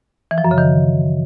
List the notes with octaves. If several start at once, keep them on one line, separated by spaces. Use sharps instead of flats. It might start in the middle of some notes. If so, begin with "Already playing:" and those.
E3
F3
F#2
C#3
D#3